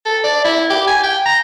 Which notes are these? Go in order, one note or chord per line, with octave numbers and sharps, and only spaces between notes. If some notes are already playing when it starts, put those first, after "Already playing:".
A4
D5
E4
G4
G#5
G5
A#5